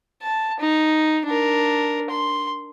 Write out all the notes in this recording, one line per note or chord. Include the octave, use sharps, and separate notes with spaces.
A5
D#4
D4 A#4
C6